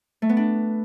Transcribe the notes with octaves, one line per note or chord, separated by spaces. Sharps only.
A3
B3
D4